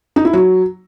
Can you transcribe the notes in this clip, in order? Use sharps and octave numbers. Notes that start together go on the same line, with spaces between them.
D#4
E4
F#3